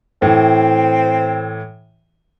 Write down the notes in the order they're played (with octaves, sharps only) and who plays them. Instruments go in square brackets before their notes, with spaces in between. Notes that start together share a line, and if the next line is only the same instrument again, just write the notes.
[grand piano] A2 E3 [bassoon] C4